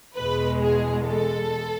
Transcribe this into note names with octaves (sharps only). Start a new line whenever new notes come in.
E2 B2 G#3 B4
G#4
A4